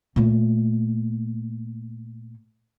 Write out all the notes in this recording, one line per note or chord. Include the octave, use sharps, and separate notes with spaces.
A#2 A3